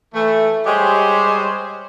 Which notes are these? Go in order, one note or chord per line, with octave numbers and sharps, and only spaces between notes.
E3 A3
G3 G#3 G4 C5 C#5